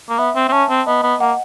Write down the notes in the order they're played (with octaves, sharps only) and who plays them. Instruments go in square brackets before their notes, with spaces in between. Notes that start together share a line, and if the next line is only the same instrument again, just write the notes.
[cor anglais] A#3
[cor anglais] B3 [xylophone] E5
[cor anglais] C4
C4
[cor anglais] C#4 [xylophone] A5
[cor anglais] C4
[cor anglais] B3 [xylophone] D#5
[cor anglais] B3
[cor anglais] A#3 [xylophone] F#5